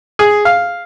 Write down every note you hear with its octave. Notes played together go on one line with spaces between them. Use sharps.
G#4
F5